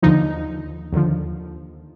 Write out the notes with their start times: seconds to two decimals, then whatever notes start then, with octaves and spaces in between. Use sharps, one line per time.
0.02 D#2 D3 F3 D#4
0.93 D#2 D3 F3